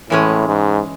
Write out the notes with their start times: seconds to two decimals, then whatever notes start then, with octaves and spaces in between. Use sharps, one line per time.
0.10 A2 E3 G#3 C#4
0.48 G#2